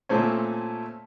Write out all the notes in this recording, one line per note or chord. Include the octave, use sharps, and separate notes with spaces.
A#2 A3 C4 C#4